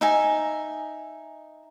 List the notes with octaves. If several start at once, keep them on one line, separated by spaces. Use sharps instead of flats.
D#4 E5 G#5